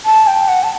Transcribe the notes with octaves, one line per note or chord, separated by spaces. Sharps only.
A5
G5
F#5
A5